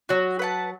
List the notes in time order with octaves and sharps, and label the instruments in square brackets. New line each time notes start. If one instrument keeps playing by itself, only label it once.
[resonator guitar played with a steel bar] F#3 [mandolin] F#4
[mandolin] B4 F#5 A5